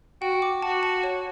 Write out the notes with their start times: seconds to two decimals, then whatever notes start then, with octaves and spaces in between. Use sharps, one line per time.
0.21 F#4 G5
0.42 D6
0.62 F#4 A5
0.83 A5
1.03 C#5